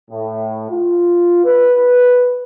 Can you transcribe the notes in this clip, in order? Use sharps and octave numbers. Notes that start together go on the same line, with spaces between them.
A2
F4
B4